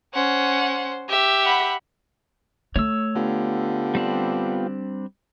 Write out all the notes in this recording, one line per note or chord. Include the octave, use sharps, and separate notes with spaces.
C#4 C5 F#5
G4 E5
F#5 B5
A3 C#5 E6
D3 B3 F4 G4
G3 C4 D4